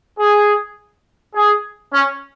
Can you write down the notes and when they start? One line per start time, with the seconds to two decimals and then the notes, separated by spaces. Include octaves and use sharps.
0.16 G#4
1.33 G#4
1.91 C#4